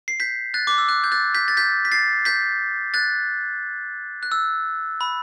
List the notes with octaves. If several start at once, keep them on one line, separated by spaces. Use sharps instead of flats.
C7
G6 B6
F#6 A6
D6
E6
F#6
G6
F#6 A6
G6 B6
A6
G6 B6
B6
A6 C7
G6 B6
F#6 A6
F#6
E6
B5